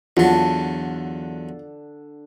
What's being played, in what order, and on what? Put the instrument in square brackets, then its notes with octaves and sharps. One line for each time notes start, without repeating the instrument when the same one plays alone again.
[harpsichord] E2 F#3 [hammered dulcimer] D3 [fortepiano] F4